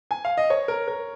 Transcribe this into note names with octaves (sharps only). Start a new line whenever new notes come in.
G#5
F5
D#5
C#5
A#4
A#4